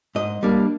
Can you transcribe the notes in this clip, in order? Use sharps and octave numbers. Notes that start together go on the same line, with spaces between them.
G#2 D#5
G3 A#3 D4